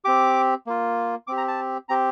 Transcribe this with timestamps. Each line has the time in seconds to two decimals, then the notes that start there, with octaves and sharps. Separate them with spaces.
0.05 C4 G4 D6
0.67 A#3 F4
1.27 C4 G4 D6
1.37 A#5
1.48 A5
1.89 C4 G4 A#5